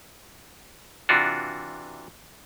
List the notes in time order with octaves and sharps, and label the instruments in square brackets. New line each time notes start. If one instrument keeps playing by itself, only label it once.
[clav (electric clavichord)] C3 E3 D4 F4 F#4